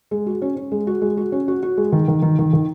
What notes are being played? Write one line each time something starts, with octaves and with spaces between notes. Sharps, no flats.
G#3
F#4
C#4
C#4
G#3
F#4
G#3
F#4
C#4
F#4
F#4
G#3
D#3
D#3
D#3
D#3
D#3